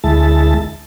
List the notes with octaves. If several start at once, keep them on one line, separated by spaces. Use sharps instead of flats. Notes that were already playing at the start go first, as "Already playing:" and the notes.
D2 G#3 E4 A5